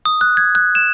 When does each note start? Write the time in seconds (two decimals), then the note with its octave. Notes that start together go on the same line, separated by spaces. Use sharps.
0.05 D#6
0.21 F#6
0.37 G#6
0.55 F#6
0.75 E7